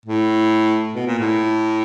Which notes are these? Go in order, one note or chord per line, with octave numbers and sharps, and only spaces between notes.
A2
B2
A#2
A2